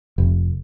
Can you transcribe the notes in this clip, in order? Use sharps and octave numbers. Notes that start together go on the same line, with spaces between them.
F1